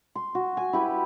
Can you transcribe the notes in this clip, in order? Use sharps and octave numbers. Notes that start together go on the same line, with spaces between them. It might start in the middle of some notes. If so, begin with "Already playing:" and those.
C6
F#4
G#5
E4 G4 B4